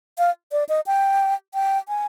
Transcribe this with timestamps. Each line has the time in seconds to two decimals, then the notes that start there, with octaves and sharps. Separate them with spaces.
0.18 F5
0.52 D5
0.69 D#5
0.86 G5
1.54 G5
1.88 G#5